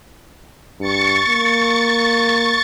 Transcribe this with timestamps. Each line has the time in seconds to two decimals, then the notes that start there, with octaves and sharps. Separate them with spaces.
0.80 G2 C#6 A6 C#7
1.28 A#3